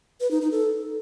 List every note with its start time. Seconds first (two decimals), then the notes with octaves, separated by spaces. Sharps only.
0.21 B4
0.31 D#4
0.41 D#4
0.52 A4